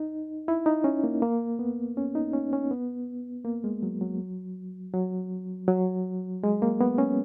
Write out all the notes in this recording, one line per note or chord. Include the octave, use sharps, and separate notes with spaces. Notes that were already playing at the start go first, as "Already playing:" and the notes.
Already playing: D#4
E4
D#4
C#4
A#3
A#3
B3
C#4
D#4
C#4
C#4
B3
A#3
G#3
F#3
F#3
F#3
F#3
G#3
A#3
B3
C#4